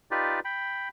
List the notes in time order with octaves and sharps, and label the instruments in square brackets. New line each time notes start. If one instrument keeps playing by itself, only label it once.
[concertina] D#4 F4 G4 B4 D5
G5 B5